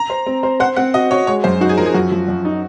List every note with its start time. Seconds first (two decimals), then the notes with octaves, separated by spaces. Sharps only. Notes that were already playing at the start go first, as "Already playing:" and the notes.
Already playing: A#5
0.10 C5
0.26 C4
0.43 C5
0.60 C5 F#5
0.77 C4 F#5
0.94 F#4 D#5
1.11 F#4 C#5
1.27 G#3 C#5
1.44 F#2 C5
1.61 D#4 F#4
1.69 G#4
1.78 F3 A#4
1.86 G#4
1.94 F#2 F#4
2.12 F3
2.28 F#2
2.45 D#4